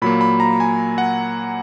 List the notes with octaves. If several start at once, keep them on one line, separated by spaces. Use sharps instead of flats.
A#2 F#3 A#3 B5
B5
A#5
G#5
F#5